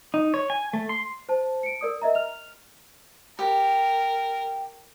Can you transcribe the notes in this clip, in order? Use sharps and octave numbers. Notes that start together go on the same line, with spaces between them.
D#4
C#5
G#5
A3
C6
C5 A5
C#7 D7
A#4 D5 D#6
A#4 D#5 E5 A#5
F6 F7
G4 A#4